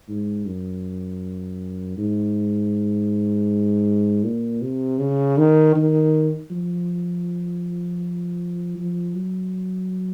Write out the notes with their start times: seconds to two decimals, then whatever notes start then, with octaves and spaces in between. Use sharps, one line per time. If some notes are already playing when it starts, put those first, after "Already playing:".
0.09 G#2
0.46 F#2
1.98 G#2
4.24 A#2
4.62 C3
5.00 C#3
5.38 D#3
5.76 D#3
6.51 F3
8.78 F3
9.15 F#3